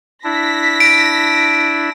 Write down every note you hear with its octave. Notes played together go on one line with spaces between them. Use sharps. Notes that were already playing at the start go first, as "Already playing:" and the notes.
D4 E4 A#6 B6
D7